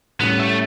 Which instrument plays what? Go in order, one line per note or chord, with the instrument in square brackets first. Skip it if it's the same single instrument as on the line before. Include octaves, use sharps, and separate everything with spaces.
[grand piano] A2 G3 C#4 [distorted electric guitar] B3
[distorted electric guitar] A3